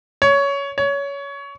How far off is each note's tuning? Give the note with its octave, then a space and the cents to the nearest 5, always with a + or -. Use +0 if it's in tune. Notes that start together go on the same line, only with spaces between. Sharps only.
C#5 +15
C#5 +20